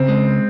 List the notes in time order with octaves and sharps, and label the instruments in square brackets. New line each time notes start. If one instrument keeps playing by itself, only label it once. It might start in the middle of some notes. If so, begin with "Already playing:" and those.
Already playing: [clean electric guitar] C#3 [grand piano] C4
[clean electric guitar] G#3